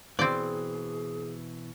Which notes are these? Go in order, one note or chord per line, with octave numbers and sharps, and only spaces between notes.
B2 E3 C4 G#4 D5